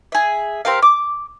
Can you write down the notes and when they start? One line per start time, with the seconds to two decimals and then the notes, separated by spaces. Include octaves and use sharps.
0.12 G#4 E5
0.65 C4 G4 A#4 F5
0.82 D6